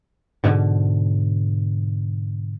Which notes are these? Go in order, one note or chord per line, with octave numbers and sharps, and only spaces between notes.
G#2 B2 D3